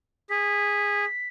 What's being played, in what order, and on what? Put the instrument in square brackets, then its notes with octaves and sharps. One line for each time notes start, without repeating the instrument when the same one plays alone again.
[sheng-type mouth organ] G#4 [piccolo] B6